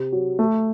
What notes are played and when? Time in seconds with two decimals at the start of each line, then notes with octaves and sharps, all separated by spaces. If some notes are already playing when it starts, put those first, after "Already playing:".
Already playing: C3
0.12 F#3
0.39 A3